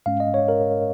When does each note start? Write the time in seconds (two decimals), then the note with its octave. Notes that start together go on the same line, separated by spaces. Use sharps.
0.06 G#2 G#3 C#4 F5
0.20 D#5
0.34 C#5
0.48 A#4